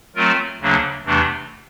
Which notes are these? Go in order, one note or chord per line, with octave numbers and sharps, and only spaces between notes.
F#3 A3 C4 F4 A#4
D2 C#3 F#3 A#3 D4
E2 C3 E3 A3 D4